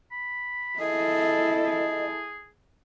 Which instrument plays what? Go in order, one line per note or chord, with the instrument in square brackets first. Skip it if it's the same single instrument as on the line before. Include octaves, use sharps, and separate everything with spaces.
[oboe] B5
[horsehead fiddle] E4 A4 [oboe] G#4 [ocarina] D#5
[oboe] G#4